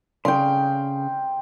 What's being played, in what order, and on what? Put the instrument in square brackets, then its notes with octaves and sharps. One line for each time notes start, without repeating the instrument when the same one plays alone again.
[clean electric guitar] C#3 [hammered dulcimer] G5 C6